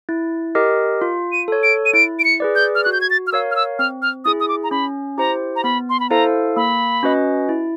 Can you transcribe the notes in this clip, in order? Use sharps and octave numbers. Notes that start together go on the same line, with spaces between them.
E4
G4 A#4 D#5
F4
D#7
A4 C#5
D7
D#7
E4 D7
D7
C#7
G#4 B4 D5
G6
F6
F#4 F#6
G6
G#6
A6
F6
A#4 C#5 F5 E6
F6
E6
C4 F6
F6
E4 G#4 D#6
D#6
D6
A#5
C#4 B5
E4 G4 C5 A#5
A#5
B3 B5
C6
B5
E4 A4 C5 F5 A#5
A#3 B5
C#4 F#4 B4 D#5
E4